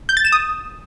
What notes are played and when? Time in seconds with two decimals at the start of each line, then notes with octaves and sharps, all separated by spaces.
0.09 G6
0.17 A6
0.25 E7
0.32 D#6